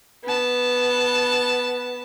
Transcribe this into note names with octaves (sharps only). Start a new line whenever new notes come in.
B3 A5